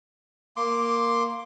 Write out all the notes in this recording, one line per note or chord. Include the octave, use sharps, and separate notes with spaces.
A#3 C6 D6